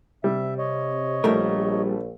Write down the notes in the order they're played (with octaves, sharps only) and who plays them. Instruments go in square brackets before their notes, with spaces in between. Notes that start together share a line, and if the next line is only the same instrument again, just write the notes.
[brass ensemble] C3 [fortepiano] G3 [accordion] E5
[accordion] C#5 D#5
[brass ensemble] A#1 [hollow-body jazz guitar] G3 A#3 A#4 [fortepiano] A3